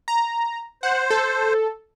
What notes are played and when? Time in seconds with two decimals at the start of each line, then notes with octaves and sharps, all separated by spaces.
0.08 A#5
0.83 C5 F#5
1.10 A4